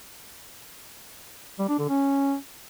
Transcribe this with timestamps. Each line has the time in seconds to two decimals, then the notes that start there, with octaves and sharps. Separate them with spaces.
1.59 G3
1.69 D4
1.79 D3
1.89 C#4